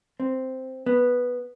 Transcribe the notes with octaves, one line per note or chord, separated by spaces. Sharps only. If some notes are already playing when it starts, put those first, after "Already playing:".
C4
B3